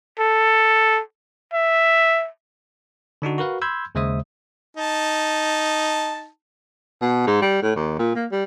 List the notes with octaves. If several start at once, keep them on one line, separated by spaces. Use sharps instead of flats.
A4
E5
D3 D4 D#4 F#4
F#4 A#4 B4 F5
B5 C6 E6 G6 G#6
D#2 C#3 G#3 C5 E5 D#6
D#4 A5
B2
G#2
G3
A2
D#2
A#2
A#3
G3